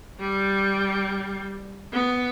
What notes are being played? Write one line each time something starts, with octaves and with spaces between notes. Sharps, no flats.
G3
B3